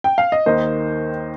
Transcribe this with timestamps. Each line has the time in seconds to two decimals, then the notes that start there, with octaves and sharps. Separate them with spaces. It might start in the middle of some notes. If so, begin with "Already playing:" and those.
0.04 G5
0.18 F5
0.32 D#5
0.46 D#2 D#3 A#3 D#4 C5